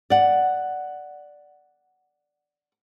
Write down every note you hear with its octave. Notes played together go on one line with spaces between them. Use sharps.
D5 F#5